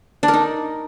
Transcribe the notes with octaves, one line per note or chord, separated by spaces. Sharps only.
D4
A#4
D#4